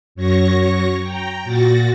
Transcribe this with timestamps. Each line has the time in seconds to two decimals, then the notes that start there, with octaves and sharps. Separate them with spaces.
0.15 F#2 F#3 C#5 C#6 A#6
1.02 G5 A#5
1.44 A#2 F#4 A6 A#6